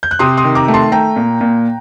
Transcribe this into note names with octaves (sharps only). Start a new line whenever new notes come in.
G6
F#6
C3 C6 D#6
C6 D#6
D#3
A#5 D6
A3
A5 C6
A3 G5 A#5
A#2
A#2